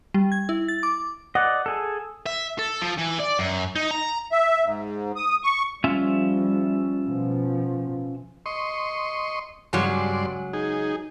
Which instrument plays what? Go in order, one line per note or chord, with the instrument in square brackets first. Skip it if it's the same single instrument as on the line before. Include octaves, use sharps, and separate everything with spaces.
[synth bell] G3
G#6
E4
A6
D6
[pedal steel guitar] D5 D#5 [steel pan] F#5
[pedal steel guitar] G#4 A4
[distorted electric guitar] E5
A4
F3
E3
D5
F#2
D#4
A#5
[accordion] E5
G#2
D#6
C#6
[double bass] F3 G3 [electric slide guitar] C#4 F4 E5
[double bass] B2 F3
[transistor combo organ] D#5 C6 C#6
[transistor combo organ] G2 D5 C6 [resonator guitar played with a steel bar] C#3 F#3 G#3
[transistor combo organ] D#4 G#4